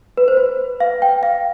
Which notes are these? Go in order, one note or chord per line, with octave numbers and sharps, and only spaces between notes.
B4
C5
B4
F5
G5
F5